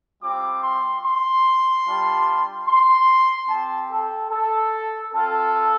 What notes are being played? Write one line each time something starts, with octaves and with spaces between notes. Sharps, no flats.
G3 C4 F4 D6
C6
C6
G3 D4 F4
C6
C4 G4 A5
A4
A4
C4 F4 A4